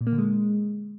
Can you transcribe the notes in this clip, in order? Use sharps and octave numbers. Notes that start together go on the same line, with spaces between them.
A#2
A#3
D3
G#3